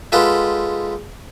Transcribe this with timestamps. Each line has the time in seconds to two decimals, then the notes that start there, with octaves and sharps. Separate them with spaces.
0.12 G#3 F4 G4 A4 B4 F#5